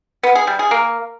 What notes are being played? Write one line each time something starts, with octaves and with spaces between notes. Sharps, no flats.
B3
G#4
G3
G#4
A#3